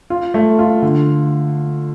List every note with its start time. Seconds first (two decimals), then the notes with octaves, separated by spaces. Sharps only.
0.10 F4
0.34 A3
0.59 F4
0.82 D3